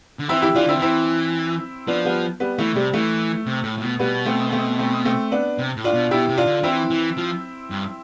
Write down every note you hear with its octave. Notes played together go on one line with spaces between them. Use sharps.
D3
E3 C4 E4
E4 G4
E3 D4 F4
D3 C4 E4
E3
C4 E4
F3 B3 D4
G3 B3
G3 B3
E3 A3
C3 G3
E3 A3
C3
A2
A2
B2
B2 G3 B3
A3 C4
A3 C4
A3 C4
A3 C4
B3 D4
C3
A2
D4 F4
B2
B2 E4 G4
C3
D4 F4
D3
E3 C4 E4
E3
F3
G2